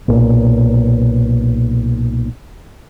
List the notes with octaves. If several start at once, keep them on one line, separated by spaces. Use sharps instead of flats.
B1 A#2